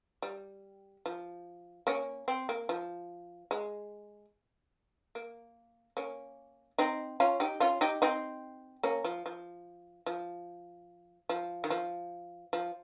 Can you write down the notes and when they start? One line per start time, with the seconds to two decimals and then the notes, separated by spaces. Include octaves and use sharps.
0.22 G3
1.06 F3
1.87 A#3 C#4
2.28 C4
2.49 A#3
2.69 F3
3.51 G#3
5.15 A#3
5.97 A#3 C#4
6.78 C4 D#4
7.20 C#4 F4
7.40 D#4 G4
7.60 C#4 F4
7.81 D#4 G4
8.02 C4 D#4
8.83 A#3 C#4
9.05 F3
9.26 F3
10.06 F3
11.29 F3
11.64 D#3
11.70 F3
12.53 F3